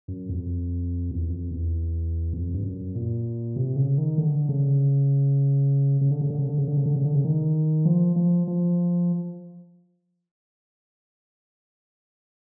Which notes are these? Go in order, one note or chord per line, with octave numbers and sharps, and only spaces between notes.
F#2
F2
E2
F2
E2
F2
G2
F#2
A#2
C3
C#3
D#3
D3
C#3
C#3
D3
C#3
D3
C#3
D3
C#3
D3
C#3
D3
C#3
D3
C#3
D#3
F3
F3
F3